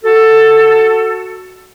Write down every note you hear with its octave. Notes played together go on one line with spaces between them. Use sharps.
F#4 A4